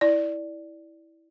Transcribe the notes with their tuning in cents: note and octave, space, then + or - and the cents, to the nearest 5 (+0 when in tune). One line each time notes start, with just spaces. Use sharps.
E4 -10 D5 +0